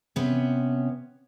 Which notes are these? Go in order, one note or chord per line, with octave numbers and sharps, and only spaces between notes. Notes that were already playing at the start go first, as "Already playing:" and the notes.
C3 B3 C#4